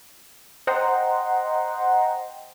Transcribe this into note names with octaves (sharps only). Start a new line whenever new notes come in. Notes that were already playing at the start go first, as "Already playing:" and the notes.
C5 D#5 F#5 G5 A#5 C6